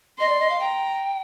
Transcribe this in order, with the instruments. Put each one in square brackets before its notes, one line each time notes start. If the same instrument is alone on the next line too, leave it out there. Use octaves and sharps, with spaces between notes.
[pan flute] D#5 [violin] C6
[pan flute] D5
D#5
F5
[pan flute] G5 [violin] A#5